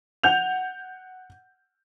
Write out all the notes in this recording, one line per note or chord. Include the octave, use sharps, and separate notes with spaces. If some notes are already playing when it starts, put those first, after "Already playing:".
F#5 G6 F7